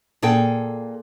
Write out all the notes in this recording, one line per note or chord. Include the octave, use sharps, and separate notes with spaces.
A#2 G#4 A4 G5